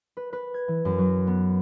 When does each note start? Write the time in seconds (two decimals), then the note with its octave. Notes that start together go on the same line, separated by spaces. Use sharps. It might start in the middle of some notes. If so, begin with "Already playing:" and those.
0.17 B4
0.33 B4
0.54 G#6
0.68 E3
0.85 F#2
0.98 F#3
1.27 B3